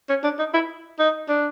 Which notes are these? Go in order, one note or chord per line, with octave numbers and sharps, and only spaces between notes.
C#4
D4
D#4
E4
D#4
D4